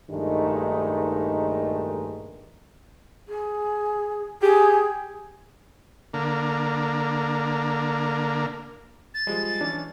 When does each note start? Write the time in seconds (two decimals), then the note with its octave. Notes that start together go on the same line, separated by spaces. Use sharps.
0.11 A#1 G2 D#3 G#3 A3 D#4
3.29 G#4
4.42 G4 G#4
6.14 D3 A#3
9.14 A6
9.27 F3 G3 G#3
9.61 E3 C#4 D4